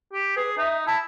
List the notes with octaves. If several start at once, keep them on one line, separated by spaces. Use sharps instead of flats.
G4
G#4 B4
D#4 E5
E4 A5